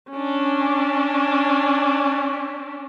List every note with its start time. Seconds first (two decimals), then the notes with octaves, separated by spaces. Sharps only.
0.11 C#4 D4